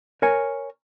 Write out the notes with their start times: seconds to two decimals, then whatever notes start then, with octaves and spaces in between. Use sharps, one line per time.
0.22 A#4 C#5 G#5